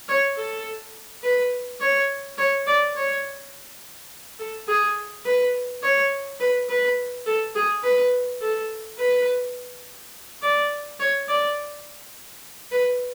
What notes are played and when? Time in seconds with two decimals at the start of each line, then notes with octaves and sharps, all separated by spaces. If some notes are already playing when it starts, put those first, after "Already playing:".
0.09 C#5
0.37 A4
1.23 B4
1.81 C#5
2.38 C#5
2.67 D5
2.95 C#5
4.39 A4
4.68 G#4
5.25 B4
5.83 C#5
6.40 B4
6.69 B4
7.26 A4
7.55 G#4
7.84 B4
8.41 A4
8.98 B4
10.42 D5
10.99 C#5
11.28 D5
12.72 B4